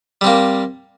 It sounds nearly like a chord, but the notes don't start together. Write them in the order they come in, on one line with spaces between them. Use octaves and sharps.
G3 C4 A#3